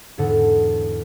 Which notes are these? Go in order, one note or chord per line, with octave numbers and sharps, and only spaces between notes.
E2 G#2 D3 A4 F#5